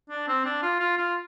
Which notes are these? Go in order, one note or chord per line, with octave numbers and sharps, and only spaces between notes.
D4
C4
D4
F4
F4
F4